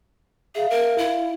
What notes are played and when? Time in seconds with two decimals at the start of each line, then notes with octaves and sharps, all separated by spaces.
0.55 G#4 E5 F5
0.70 A#4
0.98 E4